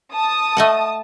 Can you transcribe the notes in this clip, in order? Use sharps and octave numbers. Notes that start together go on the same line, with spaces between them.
A5 D#6
A3 D#5 F#5